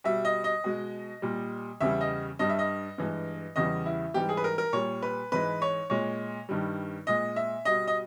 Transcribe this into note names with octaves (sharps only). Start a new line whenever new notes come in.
B2 G3 E5
D#5
D#5
B2 G#3
A#2 G3
E2 C#3 E3 G3 E5
D#5
G2 G3 D#5
E5
D#5
G2 E3 G#3
E2 C#3 E3 G3 D#5
E4
G#2 E3 G3 G4
G#4
B4
A#4
A#4
A#2 G3 C#5
B4
G#2 E3 G#3 B4
C#5
A#2 G#3 C#5
G2 D#3 G3
A#2 G#3 D#5
E5
B2 G3 D#5
D#5